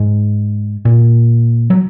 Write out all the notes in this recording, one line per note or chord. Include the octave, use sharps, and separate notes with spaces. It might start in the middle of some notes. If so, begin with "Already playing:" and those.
Already playing: G#2
A#2
F#3